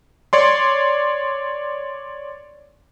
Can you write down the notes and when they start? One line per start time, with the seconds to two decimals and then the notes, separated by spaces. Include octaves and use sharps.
0.33 C#5 D5 C6